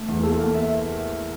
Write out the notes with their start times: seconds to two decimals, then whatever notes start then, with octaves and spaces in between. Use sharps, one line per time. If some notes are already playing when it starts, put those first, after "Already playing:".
Already playing: A3
0.08 E2
0.23 A#3 A4
0.38 A#3
0.53 E5